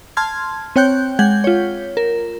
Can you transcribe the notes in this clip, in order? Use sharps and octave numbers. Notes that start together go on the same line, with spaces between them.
A5 C6 F6 G#6
C4 C#5 G5 F#6 G6
G#3 F#5 G6 G#6
F4 C#5
A#4